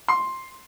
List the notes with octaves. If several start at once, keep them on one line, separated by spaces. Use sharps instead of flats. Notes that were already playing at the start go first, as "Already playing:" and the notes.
C6